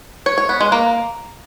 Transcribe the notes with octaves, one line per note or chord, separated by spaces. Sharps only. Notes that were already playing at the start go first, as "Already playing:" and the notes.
C#5
C#5
B3
G#3
A#3